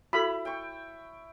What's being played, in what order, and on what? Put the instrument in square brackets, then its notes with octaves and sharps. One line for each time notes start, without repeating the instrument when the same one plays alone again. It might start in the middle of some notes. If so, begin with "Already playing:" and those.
[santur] E4 [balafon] F#4 A4 [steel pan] B5
[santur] G5 C#6